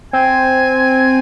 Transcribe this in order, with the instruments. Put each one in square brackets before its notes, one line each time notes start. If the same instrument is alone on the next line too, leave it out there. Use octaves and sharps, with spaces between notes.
[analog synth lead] C4 [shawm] G#5